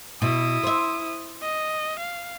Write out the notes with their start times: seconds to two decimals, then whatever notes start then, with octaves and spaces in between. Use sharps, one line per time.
0.22 B2 E4 D#6
0.63 C5 E5
1.42 D#5
1.99 F5